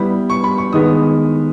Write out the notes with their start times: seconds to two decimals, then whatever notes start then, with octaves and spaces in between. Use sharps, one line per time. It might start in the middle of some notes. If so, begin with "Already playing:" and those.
Already playing: G3 B3 E4 B5
0.30 C#6
0.44 B5
0.58 C#6
0.73 D#3 G#3 B3 D#6